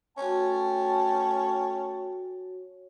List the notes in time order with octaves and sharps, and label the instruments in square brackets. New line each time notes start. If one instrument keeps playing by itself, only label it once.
[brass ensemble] A3 G5 A5 [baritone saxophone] C#4 [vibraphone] F#4 C#5